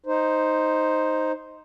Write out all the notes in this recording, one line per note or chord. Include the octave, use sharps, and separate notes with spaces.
D#4 C5